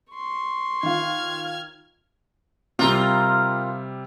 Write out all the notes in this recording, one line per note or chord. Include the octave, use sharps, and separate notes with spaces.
C6 C#6
D#3 F4 F6 G#6
C3 G3 F4 A#4